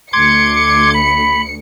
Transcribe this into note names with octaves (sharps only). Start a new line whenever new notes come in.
D2 C6 D6 G#6 C#7
B5